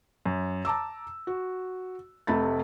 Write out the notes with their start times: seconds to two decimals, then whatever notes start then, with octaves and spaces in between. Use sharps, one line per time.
0.26 F#2
0.65 A5 A#5 D6 E6
1.27 F#4
2.27 F1 C3 A3 B5 A6